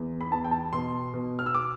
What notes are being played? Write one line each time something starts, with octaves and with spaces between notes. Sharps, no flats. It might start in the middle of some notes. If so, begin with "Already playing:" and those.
Already playing: E2
B5
E2 A5
G5
A5
B2 C6
B2
F6
E6
D6